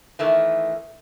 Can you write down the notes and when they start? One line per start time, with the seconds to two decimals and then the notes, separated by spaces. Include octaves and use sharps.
0.19 D#3 E3 A3